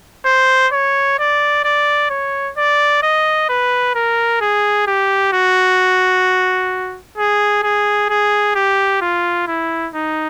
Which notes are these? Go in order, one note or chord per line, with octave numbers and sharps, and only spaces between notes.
C5
C#5
D5
D5
C#5
D5
D#5
B4
A#4
G#4
G4
F#4
G#4
G#4
G#4
G4
F4
E4
D#4